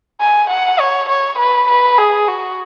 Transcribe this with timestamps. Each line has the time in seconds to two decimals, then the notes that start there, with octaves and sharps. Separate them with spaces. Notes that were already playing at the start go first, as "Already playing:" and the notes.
0.21 G#5
0.50 F#5
0.80 C#5
1.10 C#5
1.39 B4
1.69 B4
1.98 G#4
2.28 F#4